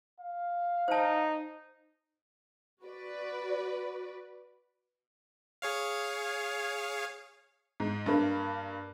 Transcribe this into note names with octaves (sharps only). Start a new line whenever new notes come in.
F5
D#4 C5 A5
F#4 B4 D5
G#4 C#5 F5
G#2
G2 A#3